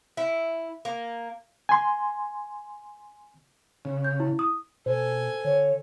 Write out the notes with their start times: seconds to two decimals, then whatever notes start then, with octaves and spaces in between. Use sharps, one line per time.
0.17 E4
0.85 A#3
1.69 G#5 C6
3.85 C#3
4.04 G6
4.20 E4
4.39 D#6
4.86 B2 A4 C5 G#5
5.45 D3 C#5